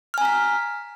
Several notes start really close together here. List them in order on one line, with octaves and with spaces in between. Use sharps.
F6 G#5 A#5 B6